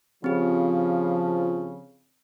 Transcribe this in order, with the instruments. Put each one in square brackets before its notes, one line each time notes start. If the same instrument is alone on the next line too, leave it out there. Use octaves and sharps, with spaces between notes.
[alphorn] C#3 [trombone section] F3 [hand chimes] C4 G4